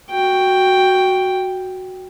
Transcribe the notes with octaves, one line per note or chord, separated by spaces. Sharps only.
F#4 G5